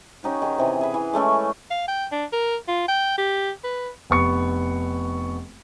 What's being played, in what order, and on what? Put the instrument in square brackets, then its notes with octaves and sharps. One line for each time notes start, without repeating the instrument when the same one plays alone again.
[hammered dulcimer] C#4 D#4 G4 F#5
D#3 G#4
C3 E3
G#4 B4
E3
G#3 A3 C#4 E4
[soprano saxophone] F5
G5
D4
A#4
F4
G5
G4
B4
[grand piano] F1 B3 C#6 C#7